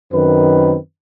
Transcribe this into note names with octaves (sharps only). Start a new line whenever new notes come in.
F#2 D#3 C4 B4